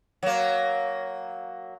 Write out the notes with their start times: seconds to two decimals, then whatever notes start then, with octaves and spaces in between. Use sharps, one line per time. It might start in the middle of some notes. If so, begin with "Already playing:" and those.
0.23 F#3 A#3